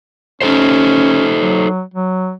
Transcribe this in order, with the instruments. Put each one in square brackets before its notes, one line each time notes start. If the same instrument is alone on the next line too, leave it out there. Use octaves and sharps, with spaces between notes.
[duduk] C#4 [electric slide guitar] D#4 A4 C5
[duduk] F#3
F#3